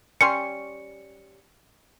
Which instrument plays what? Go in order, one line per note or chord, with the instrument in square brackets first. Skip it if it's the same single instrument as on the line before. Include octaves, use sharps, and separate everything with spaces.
[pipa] G3 C#4 C6 [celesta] C#7